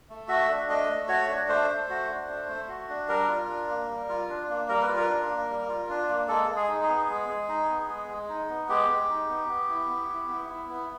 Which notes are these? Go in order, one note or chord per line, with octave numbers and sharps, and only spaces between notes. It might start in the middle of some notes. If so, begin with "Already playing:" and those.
A3
F#4 E5
D4
A3 D#5
A3
F#4 C#5
D4
A3 C5
A3
F#4
D4
A3
A3
F#4
D4
G3 A#4
F4
D4
A#3
G3
F4
D4
A#3
G3 A#4
B4
F4
A#4
D4
A#3
G3
F4
D4
A#3
G#3 A4
G#3
G#4
D#4
G#4
B3
G#3
G#3
D#4
B3
G#3
G#3
D#4
B3
G#3 G4
G#3
D#4
B3
B3
E4
B3
E4
B3
E4
B3